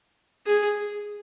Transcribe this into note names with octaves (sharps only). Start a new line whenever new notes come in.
G#4